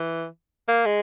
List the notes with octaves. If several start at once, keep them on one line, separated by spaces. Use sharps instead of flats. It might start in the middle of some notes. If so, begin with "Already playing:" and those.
Already playing: E3
A#3
G#3